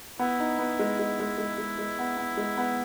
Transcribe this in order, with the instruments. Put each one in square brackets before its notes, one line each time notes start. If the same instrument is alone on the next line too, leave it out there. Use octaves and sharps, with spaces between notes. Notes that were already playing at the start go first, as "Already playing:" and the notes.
[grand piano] B3 [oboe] E4
[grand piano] D#4
B3
G#3
G#3
G#3
G#3
G#3
G#3
B3
B3
G#3
B3